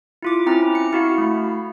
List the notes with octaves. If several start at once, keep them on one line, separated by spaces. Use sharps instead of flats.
E4 F4 D6
C4 C#4 E4 A#5
C#7
E4 F#4 F5
A3